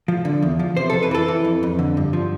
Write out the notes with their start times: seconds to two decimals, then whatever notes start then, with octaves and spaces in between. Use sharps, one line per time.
0.08 F3
0.25 D3
0.42 E2
0.59 F3
0.77 C3 C5
0.90 F2 A4
1.03 B4
1.11 E3 A4
1.28 E3
1.44 F2
1.63 F2
1.79 D3
1.97 G2
2.13 F3